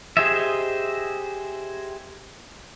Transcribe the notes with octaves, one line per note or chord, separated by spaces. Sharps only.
G4 G#4 C5 D#5 E5